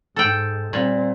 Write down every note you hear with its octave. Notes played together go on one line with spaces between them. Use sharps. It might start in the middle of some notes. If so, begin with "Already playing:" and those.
G#2 A4 G5
A#2 G3 C4